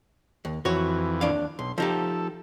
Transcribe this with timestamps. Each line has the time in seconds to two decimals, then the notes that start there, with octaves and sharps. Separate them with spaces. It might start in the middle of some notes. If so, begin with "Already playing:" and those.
0.45 D#2
0.65 F2 E3 F#4 C#5
1.21 D#2 D4 F5
1.59 B1 C6
1.78 F3 D#4 G4 A4